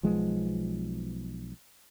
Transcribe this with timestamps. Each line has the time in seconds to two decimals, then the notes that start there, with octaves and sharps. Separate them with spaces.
0.03 B1 F3 G#3 B3